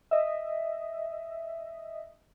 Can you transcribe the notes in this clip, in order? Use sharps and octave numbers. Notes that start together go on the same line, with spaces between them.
D#5 E5